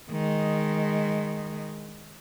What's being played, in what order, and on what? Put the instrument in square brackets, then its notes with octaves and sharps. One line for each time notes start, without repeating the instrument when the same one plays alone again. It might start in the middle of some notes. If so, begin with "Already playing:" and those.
[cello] D#3 G#3